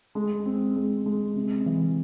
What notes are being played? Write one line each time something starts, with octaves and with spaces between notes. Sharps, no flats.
G#3
C4
G#3
G#3
C3
E3